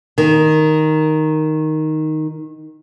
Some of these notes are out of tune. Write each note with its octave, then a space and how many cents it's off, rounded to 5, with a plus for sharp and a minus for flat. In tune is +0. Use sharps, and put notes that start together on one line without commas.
D#3 +0